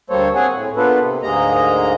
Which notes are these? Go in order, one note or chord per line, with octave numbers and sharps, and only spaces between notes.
D2 G3 A#3 A4 C5 C#5
C4 G#4 C#5 F#5 G#5
A2
A#3 B3 D4 F4 A4 B4
C3
D2 G#2 G#3 A#3 D#5 A#5